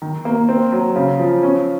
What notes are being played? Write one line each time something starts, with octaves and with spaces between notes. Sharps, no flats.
D#3
A#3
C4
F#3
C#3
F3
C#4